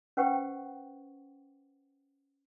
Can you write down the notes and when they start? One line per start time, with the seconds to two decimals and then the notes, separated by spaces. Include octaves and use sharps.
0.17 C#4 B4 C5 F#5 G5 C#6